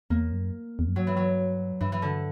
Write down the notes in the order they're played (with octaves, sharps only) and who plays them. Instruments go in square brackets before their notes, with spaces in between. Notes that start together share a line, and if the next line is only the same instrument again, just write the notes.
[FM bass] E2 [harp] A#3
[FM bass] F#2
E2
F#2
[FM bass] G2 [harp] F#3
[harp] E3
F#3
[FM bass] G2 [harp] E3
[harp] E3
D3